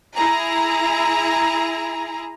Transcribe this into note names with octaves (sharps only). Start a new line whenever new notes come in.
E4 G#4 A#5